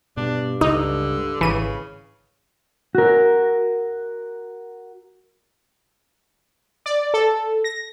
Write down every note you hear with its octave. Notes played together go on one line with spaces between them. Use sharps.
G2 B2 D4
C#2 D3 D#4
G#1 C#3 E3 D#7
F#4 A#4
D5
A4
A#6